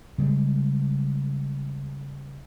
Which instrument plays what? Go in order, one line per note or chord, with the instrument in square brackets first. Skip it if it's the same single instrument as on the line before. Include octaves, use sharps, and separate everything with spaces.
[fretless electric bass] C#3 G3 G#3